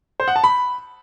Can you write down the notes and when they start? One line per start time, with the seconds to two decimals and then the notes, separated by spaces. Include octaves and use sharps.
0.20 C5
0.28 F#5
0.36 A5
0.44 B5